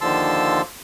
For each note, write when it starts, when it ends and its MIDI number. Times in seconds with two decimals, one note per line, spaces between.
0.01 0.61 39
0.01 0.61 50
0.01 0.61 53
0.01 0.61 81
0.01 0.61 84
0.01 0.61 88